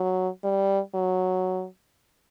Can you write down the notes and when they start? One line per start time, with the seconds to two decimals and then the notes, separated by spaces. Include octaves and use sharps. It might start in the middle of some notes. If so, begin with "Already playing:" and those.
Already playing: F#3
0.44 G3
0.94 F#3